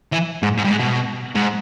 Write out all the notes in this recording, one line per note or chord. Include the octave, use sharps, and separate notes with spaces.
E3
G#2
G#2
G2
G#2
B2
G#2